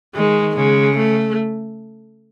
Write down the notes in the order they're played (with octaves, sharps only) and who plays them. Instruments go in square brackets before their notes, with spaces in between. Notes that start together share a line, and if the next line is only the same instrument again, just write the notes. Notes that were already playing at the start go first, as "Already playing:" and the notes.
[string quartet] D#3 [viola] G#3
[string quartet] C#3 [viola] G#3
[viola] A3